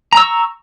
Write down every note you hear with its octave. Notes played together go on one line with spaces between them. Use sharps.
A#5 C#6 E6